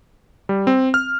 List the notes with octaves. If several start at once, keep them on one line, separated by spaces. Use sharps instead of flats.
G3
C4
F6